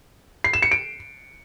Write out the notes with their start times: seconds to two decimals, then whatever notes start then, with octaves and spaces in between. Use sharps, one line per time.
0.44 C7
0.53 E7
0.62 C#7
0.72 D7